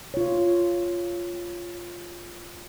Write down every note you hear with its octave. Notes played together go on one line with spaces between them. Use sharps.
F4 C#5